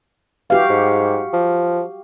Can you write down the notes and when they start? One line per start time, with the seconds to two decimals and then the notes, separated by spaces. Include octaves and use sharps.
0.50 E3 F#4 G4 F5
0.70 G#2
1.34 F3